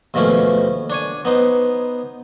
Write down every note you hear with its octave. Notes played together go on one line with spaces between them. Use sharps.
D#2 B2 F3 A3 C#4
D4 C#5 G#5
B3 D#4 C5